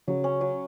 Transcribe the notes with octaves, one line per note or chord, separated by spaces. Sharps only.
C#3 F#3
C#4
F#3